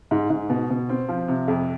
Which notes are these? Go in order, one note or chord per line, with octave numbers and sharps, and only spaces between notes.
G#2
G#2
B2
B2
C4
F3
C3
F2